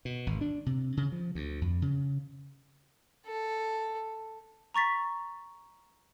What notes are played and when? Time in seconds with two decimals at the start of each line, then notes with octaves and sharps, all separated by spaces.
0.05 B2
0.27 G#1
0.41 D4
0.66 C3
0.97 C#3
1.12 F3
1.35 D2
1.61 F2
1.82 C#3
3.26 A4
4.74 A#5 C#6 A6 B6